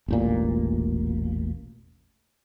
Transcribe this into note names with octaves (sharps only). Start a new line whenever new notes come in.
E1 A1 A#2